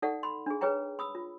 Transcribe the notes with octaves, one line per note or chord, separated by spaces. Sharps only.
D#4 A4 D5 E5 F#5
B5 C6
D4 G#4
G#4 B4 C#5 G5 A#5
B5 D#6 E6
F4